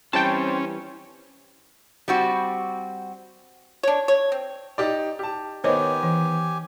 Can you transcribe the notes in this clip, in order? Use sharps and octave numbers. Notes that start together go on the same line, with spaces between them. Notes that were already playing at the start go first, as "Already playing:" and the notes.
E3 G3 C4 C#4 C#5 G5 A5
G3 C4 F#4
D4 C#5
C#5
C4
D#4 G4 D5
G4 A5
D#3 B3 G4 C5 C#5 D#5 G#5
E3